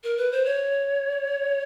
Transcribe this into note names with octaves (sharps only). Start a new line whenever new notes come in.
A#4
B4
C5
C#5